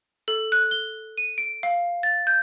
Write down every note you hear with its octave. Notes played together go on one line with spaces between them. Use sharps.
A4
F#6
G7
D#7
D7
F5
A6
G6